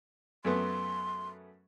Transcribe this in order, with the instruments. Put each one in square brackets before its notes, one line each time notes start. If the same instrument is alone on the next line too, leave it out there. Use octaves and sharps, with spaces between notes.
[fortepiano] F#2 A3 B3 [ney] C6